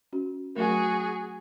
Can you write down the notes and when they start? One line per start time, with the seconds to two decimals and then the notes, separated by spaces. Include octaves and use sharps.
0.13 C#4 F#4
0.55 F#3 A3 F#4 G#4 A#4